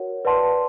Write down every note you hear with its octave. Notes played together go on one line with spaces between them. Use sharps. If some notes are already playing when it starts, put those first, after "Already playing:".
Already playing: F#4 A#4 C#5 F#5
B4 D5 F#5 A5 C6